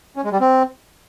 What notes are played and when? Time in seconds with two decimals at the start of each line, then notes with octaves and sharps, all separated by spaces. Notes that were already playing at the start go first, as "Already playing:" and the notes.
0.16 C#4
0.24 G#3
0.32 G3
0.40 C4